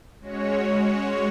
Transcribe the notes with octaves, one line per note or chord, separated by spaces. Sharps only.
G#3 C#4 F#4 C#5